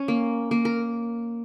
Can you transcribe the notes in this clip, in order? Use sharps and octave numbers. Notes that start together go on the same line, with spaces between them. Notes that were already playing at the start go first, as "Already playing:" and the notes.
Already playing: C#4
A#3
A#3
A#4